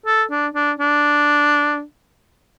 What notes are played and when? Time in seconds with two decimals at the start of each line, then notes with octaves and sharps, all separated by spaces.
0.06 A4
0.30 D4
0.55 D4
0.79 D4